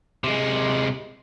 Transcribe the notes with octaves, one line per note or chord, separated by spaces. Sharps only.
C3 G#3